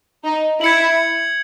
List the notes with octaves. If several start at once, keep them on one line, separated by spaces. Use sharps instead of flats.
D#4
E4 G#6 C#7 F#7